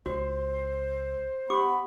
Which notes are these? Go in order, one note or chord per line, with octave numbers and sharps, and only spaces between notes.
C#2 F#4 C5
B3 G4 B5 D6